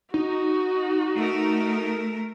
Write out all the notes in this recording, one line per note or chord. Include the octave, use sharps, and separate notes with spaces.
D#4 F#4
A3 A#4